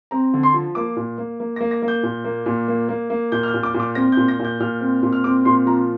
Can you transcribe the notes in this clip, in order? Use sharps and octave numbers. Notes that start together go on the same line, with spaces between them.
C4 A#5
D3
C6
F3
A#3 D6
A#2
A#3
A#3
A#6
A#3
A#6
A#3
G6
A#2
A#3
A#2
A#3
A#3
A#3
A#2 G6
F6
G6
A#2
D6
A#2
D6
C4 A#6
G6
A#2
A#6
A#2
G6
A#2 F6
C4
A#2
F6
C4 D6
A#2 C6
F3 A#5